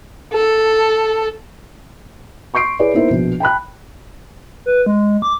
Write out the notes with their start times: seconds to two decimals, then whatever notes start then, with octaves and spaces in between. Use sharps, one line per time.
0.33 A4
2.54 C6 C#6 G6 C7 D7
2.79 E4 G#4 B4 C#5 D5
2.93 A#3 B3 D#4 E4 A#4 C5
3.10 A#1 B2
3.40 G5 A5 B5 F#6
4.66 B4
4.86 G#3
5.22 D6